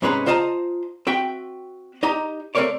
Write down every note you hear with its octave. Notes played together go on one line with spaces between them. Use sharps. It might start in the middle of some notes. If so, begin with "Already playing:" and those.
G#2 C3 G#3 C#4 B4 A#5
F4 C5 D#5 A5 A#5
C4 F#4 E5 G5
D#4 G4 D#5 A#5
A3 C4 A#4 C#5 D5